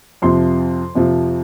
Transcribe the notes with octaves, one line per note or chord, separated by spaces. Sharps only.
F2 C3 F3 C6
F2 C3 F3